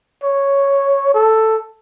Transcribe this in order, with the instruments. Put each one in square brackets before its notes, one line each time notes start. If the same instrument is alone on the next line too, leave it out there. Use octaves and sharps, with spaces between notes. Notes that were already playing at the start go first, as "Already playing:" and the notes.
[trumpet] C#5
A4